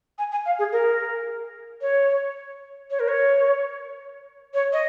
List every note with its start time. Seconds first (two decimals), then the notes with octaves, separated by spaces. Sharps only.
0.18 G#5
0.32 G#5
0.46 F5
0.59 G#4
0.72 A#4
1.81 C#5
2.91 C#5
3.00 A#4
3.08 C#5
4.54 C#5
4.73 D#5